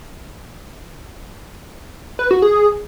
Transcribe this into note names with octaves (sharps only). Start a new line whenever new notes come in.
B4
F#4
G#4